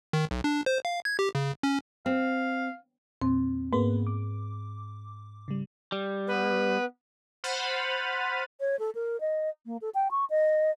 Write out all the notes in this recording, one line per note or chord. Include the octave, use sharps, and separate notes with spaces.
D#3
B1
D4
C5
F5
G#6
G4
C#3
C#4
C4 F5
E2 A#2 C4
G#2 A#3 B3 B4
D6
C#3 G3
G3
B3 B4
C5 F#5 B5 F6 A6 D#7
C#5
A4
A#4
D#5
A#3
A4
G5
C#6
D#5